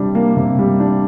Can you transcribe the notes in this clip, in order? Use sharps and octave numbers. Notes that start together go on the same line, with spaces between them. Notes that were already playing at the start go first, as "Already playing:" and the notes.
Already playing: C3 G3 D4
A#3
C3
G3
D4